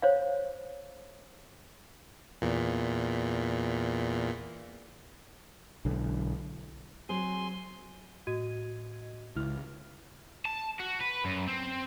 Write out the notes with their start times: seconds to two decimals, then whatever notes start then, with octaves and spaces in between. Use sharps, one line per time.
0.02 C5 C#5 F5
2.42 E2 A#2
5.85 B1 D3
7.09 F#3 C4 G#4 G#5 C6
8.27 A2 F#4 D#5 G#6 D#7
9.36 C#2 E4 F6
10.45 A5
10.80 F#4
11.01 B4
11.25 F#2
11.48 C4